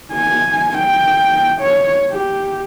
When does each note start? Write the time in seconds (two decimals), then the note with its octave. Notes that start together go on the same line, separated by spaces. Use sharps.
0.13 G#5
0.79 G5
1.61 C#5
2.12 G4